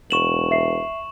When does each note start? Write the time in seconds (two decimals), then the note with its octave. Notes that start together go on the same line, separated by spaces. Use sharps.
0.11 E1 C#6 E7 F#7
0.51 E5 C7